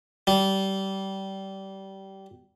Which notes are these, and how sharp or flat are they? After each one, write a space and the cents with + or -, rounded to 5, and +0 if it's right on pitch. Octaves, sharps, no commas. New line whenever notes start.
G3 -20